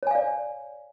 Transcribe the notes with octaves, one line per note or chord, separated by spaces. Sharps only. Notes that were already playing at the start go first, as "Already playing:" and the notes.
C#5 D5 F5 G#5